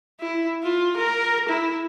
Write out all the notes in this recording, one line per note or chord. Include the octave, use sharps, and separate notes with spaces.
E4
F4
A#4
E4